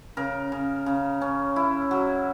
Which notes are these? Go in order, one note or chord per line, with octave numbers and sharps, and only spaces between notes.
C#3 A#4
C#3
C#3
C#4
E4
F#3